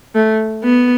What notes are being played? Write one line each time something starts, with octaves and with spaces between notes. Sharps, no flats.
A3
B3